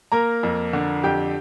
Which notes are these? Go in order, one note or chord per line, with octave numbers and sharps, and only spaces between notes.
A#3 A#4 A#5
F2
D3
F2 G4 G5